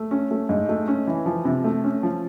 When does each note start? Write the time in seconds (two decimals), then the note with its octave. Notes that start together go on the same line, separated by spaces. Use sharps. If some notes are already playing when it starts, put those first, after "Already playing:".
Already playing: A3
0.11 C#4
0.31 A3
0.49 G#2
0.69 A3
0.88 C#4
1.07 E3
1.26 F3
1.45 C3
1.64 A3
1.84 C#4
2.03 F3